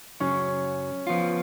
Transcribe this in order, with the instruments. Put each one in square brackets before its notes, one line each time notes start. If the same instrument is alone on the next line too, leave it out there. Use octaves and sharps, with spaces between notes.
[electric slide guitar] F#2 C#3 F#3 [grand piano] C#4
[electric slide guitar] F3 B3 F4